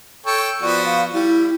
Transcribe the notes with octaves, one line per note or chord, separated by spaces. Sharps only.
A4 C#5 G5
F3 B3 F#4 D5
F5
G3 E4